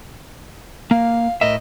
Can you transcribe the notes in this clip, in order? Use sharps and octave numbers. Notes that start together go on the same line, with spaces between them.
A#3 F5
A2 A#4 D#5 E5